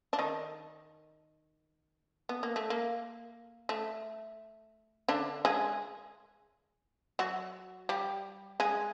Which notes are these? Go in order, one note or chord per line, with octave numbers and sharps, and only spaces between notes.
D4
D#3 D#4
B3
A#3
A3
A#3
A3
D3 D4
G#3 G#4
F#3 F#4
G3 G4
G#3 G#4